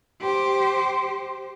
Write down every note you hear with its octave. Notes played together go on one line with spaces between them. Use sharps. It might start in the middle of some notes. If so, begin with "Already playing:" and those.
G4 C5